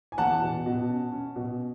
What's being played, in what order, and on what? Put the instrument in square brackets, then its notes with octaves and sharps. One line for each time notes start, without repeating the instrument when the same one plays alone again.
[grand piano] G#5
E2 F#5 A5
B2
B2
C#4
C#4
B2